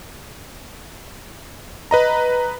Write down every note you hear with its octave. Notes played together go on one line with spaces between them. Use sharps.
B4 D#5 A#5